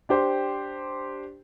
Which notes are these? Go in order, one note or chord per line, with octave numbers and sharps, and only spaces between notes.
D4 G4 C5 G5